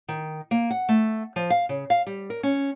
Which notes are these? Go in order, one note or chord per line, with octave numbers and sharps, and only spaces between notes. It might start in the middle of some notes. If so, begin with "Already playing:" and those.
D#3
A#3
F#5
A3
F3
F5
C#3
F5
G3
A#4
C#4